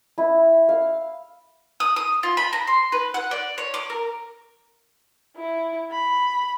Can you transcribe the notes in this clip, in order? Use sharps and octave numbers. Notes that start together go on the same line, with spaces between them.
E4
F5
D#6
D#6
F4
B5
A#5
C6
B4
F#5
D5
C#5
D6
A#4
E4
B5